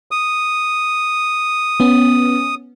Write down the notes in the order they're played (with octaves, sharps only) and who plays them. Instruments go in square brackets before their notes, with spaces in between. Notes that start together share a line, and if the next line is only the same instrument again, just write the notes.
[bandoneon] D#6
[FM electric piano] B3 C#4